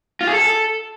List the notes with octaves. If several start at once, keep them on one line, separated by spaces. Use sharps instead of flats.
F4
G#4
A4